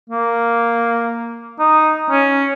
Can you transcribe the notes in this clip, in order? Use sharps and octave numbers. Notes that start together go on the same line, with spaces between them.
A#3
D#4
C#4